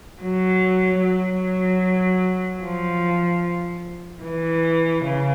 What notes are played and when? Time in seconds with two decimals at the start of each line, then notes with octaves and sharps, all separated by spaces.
0.21 F#3
1.02 F#3
2.62 F3
4.23 E3
5.04 C#3